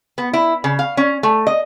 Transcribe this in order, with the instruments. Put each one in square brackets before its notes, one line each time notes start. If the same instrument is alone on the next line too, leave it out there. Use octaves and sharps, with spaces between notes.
[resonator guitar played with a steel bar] B3
E4
C#3
F5
C#4
A3
D#5